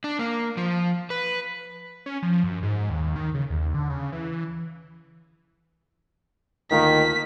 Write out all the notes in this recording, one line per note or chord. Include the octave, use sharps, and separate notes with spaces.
D4
A#3
F3
B4
C#4
F3
F#2
G#2
D#2
D#3
C#3
D#2
D3
C#3
E3
D2 D#3 A#3 F4 A#4 B6